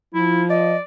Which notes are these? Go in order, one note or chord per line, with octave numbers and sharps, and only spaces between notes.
F3 E4
D5 D#5